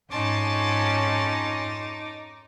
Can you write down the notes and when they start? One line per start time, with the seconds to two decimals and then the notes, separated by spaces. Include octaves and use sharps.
0.11 F2 G#2 C#4 D#4 A5 C6 D6